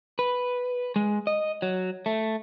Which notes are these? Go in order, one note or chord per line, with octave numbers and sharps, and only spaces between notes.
B4
G#3
D#5
F#3
A3